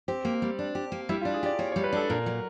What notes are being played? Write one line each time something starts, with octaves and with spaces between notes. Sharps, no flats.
C4 G4
A#3
G3
D4
G4
A#3
G3 E4
F4
D4
G#4
G4 D5
A#3 C#5
C#5
G3
B4
D4 A4
A#2 A#4
F#3